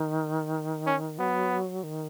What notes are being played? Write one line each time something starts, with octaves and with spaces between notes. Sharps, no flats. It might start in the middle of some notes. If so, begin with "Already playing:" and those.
Already playing: D#3
C#4
F#3 B3
D#3